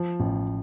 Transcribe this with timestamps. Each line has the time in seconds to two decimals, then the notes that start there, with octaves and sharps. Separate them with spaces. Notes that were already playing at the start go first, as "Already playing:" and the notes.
Already playing: F3
0.20 A1